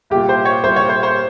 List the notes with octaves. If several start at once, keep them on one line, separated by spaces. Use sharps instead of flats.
C2 A#2 G4
C5
C#5
C2 A#2 C5
C#5
C5
C5